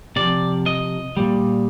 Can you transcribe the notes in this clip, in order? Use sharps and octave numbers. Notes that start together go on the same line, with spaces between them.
C3 F3 D5
D#5
A#2 G3